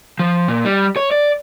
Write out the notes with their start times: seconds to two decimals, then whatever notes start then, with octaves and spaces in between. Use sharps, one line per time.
0.19 F3
0.48 A#2
0.65 G3
0.97 C#5
1.11 D5